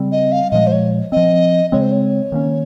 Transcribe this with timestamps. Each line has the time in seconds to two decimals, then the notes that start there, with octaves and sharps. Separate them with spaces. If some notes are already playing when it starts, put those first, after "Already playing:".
Already playing: C#3 G3 C4
0.12 D#5
0.32 F5
0.51 A#2 F3 G#3 D#5
0.67 C5
0.72 C#5
1.12 F3 C4 D#5
1.72 C#3 G#3 C4 C#5
1.81 C5
1.92 C#5
2.32 D#3 A#3 C#4